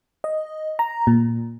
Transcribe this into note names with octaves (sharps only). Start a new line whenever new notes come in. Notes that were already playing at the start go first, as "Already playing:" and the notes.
D#5
A#5
A#2